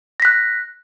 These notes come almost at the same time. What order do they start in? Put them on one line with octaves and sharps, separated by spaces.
A#6 B6 F#6